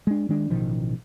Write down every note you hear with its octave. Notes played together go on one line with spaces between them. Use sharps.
G#3 D4
D#3 G#3 D4
A1 B2 D#3 F3